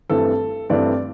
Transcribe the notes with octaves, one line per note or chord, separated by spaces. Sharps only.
G2 E3 A3 C4 A4
G2 E3 A3 C4 D5